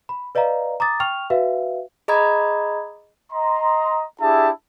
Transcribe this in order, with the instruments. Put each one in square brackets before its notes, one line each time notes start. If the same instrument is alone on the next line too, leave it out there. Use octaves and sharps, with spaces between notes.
[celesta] B5
B4 D5 D#5 F5 A#5
A#5 D6 D#6 A6
G5 C#6 F6 F7
F#4 B4 E5 F5
[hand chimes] G#4 D#5 A#5 B5 D#6 G#6
[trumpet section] D#5 A#5 C6
D4 E4 G4 G#4 E5 A5